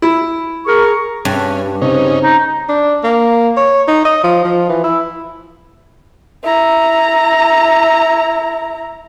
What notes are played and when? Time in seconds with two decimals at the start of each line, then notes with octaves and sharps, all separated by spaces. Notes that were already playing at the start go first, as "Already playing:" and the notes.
0.02 E4
0.66 G#4 A#4 C#6
1.25 G2 C#4
1.81 C#3 C4 C#4 D#4
2.21 D#4
2.69 D4
3.04 A#3
3.57 C#5
3.88 D#4
4.05 D#5
4.24 F3
4.45 F3
4.69 E3
4.84 E4
6.43 E4 A#5